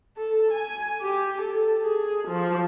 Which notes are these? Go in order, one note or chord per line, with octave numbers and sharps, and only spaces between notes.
A4
G#5
G4
A4
G#4
F3